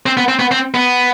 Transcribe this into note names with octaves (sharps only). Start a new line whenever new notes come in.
C4
B3
C4
B3
C4
B3